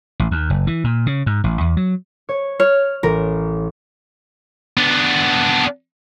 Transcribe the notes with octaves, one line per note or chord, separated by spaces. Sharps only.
A1
D#2
F#1
E3
A#2
C#3
G#2
A1
E2
F#3
C#5
C#5 F6
A1 A#4
B3 D4